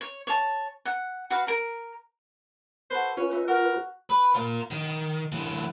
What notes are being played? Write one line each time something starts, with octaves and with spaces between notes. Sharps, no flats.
C#5
C#5 A5
F#5
F#4 B4 F5
A#4 A#5
F#4 A4 B4 C5
C#4 F4 B4 C#5
D#4 E5
F#4 A#4
B4
F4 A#4
D#3
D3 E3